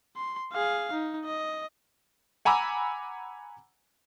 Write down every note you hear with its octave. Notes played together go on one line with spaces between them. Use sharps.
C6
G#4 F5
D#4
D#5
F#5 G#5 A#5 B5 D6 E6